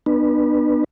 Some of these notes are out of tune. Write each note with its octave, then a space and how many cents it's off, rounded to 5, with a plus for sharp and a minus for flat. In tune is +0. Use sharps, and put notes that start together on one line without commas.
B3 +0 D4 +40 B4 -20